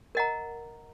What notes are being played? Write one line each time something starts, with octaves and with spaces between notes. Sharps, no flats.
A#4 D#5 F#5 A#5